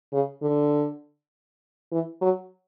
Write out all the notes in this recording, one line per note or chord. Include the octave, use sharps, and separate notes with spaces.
C#3
D3
E3
F#3